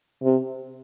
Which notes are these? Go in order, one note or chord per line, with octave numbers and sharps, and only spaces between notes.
C3